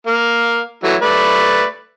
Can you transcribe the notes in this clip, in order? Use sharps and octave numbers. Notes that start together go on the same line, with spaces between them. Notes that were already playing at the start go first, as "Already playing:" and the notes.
A#3 F5
E3 F#3 A3
A3 B4 D5